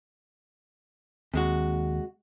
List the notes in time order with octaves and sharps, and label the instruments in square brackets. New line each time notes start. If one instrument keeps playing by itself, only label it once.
[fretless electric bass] D#2 [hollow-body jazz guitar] C3 G#3 F#4